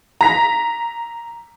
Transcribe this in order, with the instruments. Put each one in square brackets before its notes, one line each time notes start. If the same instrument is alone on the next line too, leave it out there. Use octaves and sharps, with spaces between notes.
[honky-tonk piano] A#5 B6